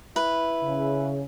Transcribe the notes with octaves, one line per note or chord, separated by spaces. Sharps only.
E4 B4
C#3